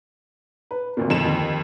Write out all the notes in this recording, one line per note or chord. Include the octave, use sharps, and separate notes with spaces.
B4
G#1 D2 A#2
F2 E7
D#2